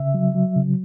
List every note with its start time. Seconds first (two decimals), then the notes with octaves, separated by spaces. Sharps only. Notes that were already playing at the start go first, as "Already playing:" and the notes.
Already playing: C#3 E5
0.14 F#3
0.35 F#3
0.56 C#3